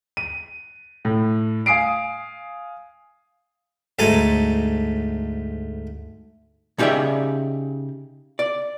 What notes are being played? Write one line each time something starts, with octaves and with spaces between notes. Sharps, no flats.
D#7
A2
F5 G#5 D#6 C7 D7
D2 G#2 A3 A4 G#5 A#5
C#3 D#4 G4 A4 D5 E5
D5